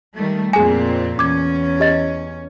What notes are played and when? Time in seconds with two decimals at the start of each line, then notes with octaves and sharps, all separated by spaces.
0.14 D#3 G3 A3
0.53 F2 A#2 C4 G#4 G#5
1.19 E2 C#4 D6 G#6
1.80 G4 D#5 A6